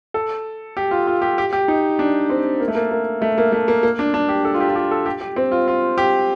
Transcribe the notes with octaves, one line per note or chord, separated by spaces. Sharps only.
A4
G4
F4
F4
G4
G4
G4
D#4
D4
C4
A#3
A3
A#3
A#3
A3
A#3
A3
A#3
A#3
D4
D4
G4
A4
F4
G4
F4
G4
A4
G4
G4
C4
F4
F4
G4